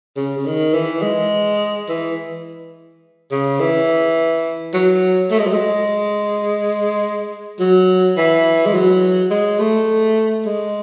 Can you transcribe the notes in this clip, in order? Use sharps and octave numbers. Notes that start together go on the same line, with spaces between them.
C#3
C#3
D#3
E3
G#3
E3
C#3
E3
F#3
A3
G#3
F#3
G#3
F#3
E3
G#3
F#3
G#3
A3
G#3